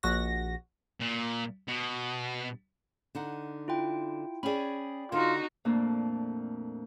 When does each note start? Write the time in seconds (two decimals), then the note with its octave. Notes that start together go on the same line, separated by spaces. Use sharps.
0.03 A#1 F#4 A#6
1.01 A#2
1.68 B2
3.15 D3 D#4 F#5
3.68 E4 F4 G5
4.43 C#4 G#4 D5 G5 B5
5.12 D3 D#4 F4 F#4
5.65 F2 A#2 A3 A#3 D4